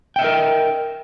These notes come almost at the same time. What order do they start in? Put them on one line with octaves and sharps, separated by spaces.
G5 E5 D#5 A#4